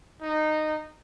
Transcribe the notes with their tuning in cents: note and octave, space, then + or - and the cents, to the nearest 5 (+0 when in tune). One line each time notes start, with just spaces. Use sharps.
D#4 -15